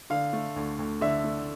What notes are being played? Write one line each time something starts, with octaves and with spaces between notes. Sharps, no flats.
D3 F5
A3
D2
D2
D3 E5
A3